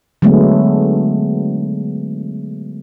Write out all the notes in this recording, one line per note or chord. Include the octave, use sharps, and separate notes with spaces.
D3 F#3 G#3 A3 B3